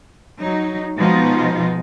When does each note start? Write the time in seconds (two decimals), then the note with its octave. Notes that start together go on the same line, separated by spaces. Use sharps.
0.40 F#3 D#4
0.98 B2 F3 G#3 B3 D#4 F4